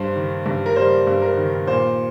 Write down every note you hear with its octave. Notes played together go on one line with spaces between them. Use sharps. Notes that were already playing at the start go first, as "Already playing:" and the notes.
Already playing: G2 C5
D#3
G2
A#4
G3 C5
G2
A#4
D#3
A#2 C5